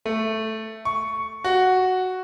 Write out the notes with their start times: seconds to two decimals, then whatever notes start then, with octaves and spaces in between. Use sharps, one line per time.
0.06 A3
0.85 C#6
1.44 F#4